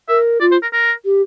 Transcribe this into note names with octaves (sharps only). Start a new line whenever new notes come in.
A#4 E5
F4 D5
C5
A#4
A#4
G4